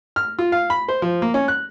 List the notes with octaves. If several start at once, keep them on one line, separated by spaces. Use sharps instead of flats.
F6
F4
F5
B5
C5
F3
A#3
C#4
F#6